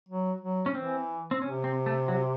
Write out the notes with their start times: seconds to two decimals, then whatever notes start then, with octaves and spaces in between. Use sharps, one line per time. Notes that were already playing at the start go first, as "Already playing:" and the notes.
0.09 F#3
0.41 F#3
0.66 C#4
0.75 E3 C4
1.31 C4
1.42 C3 C#4
1.64 C4
1.86 A3
2.08 F#3